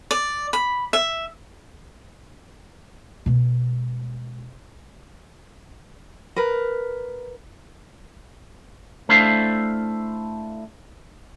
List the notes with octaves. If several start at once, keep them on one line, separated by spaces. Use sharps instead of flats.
D5
B5
E5
B2 G#3
A#4 B4
A3 D4 E4 C5 F5